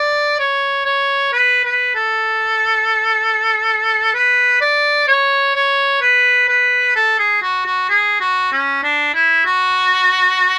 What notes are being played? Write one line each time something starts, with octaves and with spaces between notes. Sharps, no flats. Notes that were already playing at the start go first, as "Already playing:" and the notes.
Already playing: D5
C#5
C#5
B4
B4
A4
B4
D5
C#5
C#5
B4
B4
A4
G#4
F#4
F#4
G#4
F#4
C#4
D4
E4
F#4